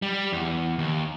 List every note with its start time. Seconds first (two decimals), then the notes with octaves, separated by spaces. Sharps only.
0.02 G3
0.32 E2
0.78 D#2